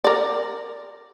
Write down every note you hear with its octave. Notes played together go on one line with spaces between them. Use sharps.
A#4 D5